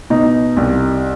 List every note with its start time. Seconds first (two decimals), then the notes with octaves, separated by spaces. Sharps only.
0.10 B2 D#4
0.57 C2